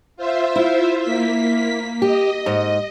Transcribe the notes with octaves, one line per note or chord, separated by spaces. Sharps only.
F4 C5 E5
E4
A#3 B6
G4 D#5
G#2